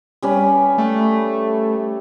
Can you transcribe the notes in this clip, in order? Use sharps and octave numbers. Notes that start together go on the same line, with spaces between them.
G3 C#4 B4
A3